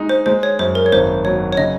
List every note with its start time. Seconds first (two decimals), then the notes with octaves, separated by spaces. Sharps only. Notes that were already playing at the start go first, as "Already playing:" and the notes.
Already playing: G#3 D#4
0.09 C5
0.26 G#3 C5
0.43 C#5
0.59 F#2 C5
0.75 A#4
0.86 C#5
0.92 G#1 C5
1.25 F#3 C#5
1.53 C#5
1.57 C#3 D#5